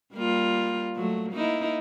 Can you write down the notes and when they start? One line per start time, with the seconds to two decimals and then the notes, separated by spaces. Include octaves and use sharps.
0.15 G3 A#3 F4
0.95 F#3 A3
1.32 A#3 D#4 E4